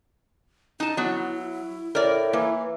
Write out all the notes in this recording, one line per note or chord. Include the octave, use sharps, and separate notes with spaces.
D#4 E4 A5
F#3 B3
A2 A#4 D5
E3 A#3